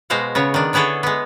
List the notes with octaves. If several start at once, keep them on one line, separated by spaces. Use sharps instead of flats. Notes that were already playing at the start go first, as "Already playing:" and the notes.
B2 G#3 C5 F5 F#5
C#3 B3 C#5
D#3 D4
D3 B3 E4 G#4 A4 C#5
G#3 B3